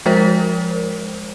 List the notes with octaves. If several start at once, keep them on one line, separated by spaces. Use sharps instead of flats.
F3 G#3 A#4 C5